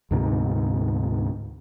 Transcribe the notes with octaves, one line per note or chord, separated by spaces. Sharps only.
D2 G#2 C3